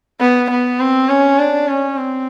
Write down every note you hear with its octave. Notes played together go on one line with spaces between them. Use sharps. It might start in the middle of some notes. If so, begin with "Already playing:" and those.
B3
B3
C4
C#4
D4
C#4
C4